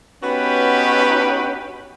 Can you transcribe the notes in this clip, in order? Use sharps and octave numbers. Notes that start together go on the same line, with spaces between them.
B3 C#4 D#4 F#4 G4 B4